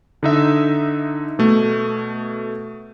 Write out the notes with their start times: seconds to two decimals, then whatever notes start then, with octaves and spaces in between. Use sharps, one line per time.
0.23 D3 D#4 E5
1.39 B2 A3